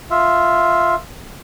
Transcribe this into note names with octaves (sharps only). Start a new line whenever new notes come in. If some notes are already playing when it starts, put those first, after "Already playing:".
F4 E5